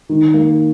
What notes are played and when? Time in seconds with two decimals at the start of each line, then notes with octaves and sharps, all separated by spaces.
0.09 D#3
0.34 A#3